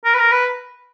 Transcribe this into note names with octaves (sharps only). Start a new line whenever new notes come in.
A#4
B4
A#4
B4